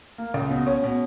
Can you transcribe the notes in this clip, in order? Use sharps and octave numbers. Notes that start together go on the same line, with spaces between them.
A#3
C#2
B2
C#4
B2